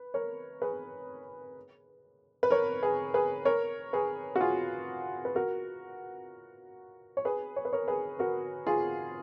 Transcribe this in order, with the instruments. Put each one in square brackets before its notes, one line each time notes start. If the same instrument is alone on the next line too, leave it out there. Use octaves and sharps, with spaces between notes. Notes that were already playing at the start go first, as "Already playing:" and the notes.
Already playing: [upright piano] B4
A#4 C#5
G#4 B4
B4
A#4 C#5
G#4 B4
G#4 B4
A#4 C#5
G#4 B4
F#4
F4 G#4
B4
F#4 A#4
C#5
G#4 B4
C#5
B4
A#4 C#5
G#4 B4
F#4 A#4
F4 G#4